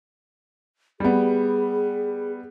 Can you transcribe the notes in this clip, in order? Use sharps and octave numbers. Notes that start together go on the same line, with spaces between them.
G3 B3 G#4